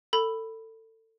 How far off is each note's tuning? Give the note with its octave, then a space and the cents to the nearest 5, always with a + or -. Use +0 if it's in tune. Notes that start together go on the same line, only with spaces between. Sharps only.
A4 +25 B5 +0